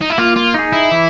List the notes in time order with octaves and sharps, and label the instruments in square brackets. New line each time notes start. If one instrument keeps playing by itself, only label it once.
[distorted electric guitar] D#4
E4
[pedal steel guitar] A#3 [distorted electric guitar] F4
[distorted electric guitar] F4
[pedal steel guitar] D#4 G#4
[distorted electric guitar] E4
[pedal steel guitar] E3